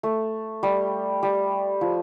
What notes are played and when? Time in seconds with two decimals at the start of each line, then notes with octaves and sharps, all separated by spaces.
0.03 A3
0.63 G3
1.23 G3
1.81 F3